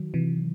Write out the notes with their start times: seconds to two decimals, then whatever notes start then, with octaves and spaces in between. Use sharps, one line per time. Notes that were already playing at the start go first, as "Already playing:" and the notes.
Already playing: D#3 F#3
0.14 C3 E3